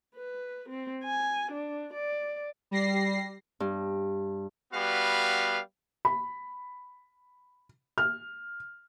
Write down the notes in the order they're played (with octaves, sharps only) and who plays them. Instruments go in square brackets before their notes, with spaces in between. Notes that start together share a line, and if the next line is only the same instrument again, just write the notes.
[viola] B4
C4
G#5
D4
D5
[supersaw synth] G3 A#6 C7
[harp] G2
[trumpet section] G3 B3 F#4 B4 F5
[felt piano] B5
F6